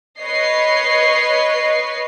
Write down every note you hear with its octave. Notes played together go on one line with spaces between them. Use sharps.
B4 C#5 D#5 C7